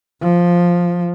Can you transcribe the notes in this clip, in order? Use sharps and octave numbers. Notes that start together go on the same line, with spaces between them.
F3